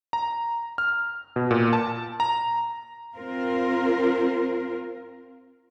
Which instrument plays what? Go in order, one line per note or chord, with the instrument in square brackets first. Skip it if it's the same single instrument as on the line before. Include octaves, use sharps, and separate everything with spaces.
[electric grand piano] A#5
F6
B2
A#2
A5
A#5
[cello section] C4 F4 A#4